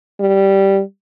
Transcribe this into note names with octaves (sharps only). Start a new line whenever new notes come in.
G3